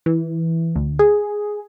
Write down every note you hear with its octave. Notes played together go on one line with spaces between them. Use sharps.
E3
D2
G#4